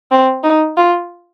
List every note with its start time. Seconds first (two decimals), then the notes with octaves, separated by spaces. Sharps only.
0.11 C4
0.44 D#4
0.77 F4